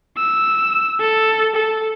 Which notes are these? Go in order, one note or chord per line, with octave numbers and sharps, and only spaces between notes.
E6
A4
A4